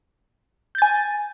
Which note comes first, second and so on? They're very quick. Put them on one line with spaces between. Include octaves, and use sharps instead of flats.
G6 A6 G#5